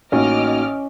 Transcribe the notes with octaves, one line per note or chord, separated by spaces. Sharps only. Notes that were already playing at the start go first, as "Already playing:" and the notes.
A1 A#3 C#4 D#4 F#4 D#5 D6 F6